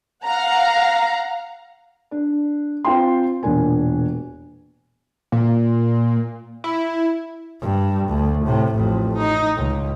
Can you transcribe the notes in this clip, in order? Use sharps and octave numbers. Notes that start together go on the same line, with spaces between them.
F5 F#5 A#5
D4
C4 F4 G5 C6
E1 A#2 D4 A#4 G#5
A#2
E4
G2
D2
A2 C3
A1 F2
D#4
C#2